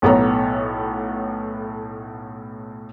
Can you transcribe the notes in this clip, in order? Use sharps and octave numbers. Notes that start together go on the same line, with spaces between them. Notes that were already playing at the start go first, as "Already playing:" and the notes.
B1 A2 B3 A4 C#5 A#5